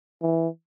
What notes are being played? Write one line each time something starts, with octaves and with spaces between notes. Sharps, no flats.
E3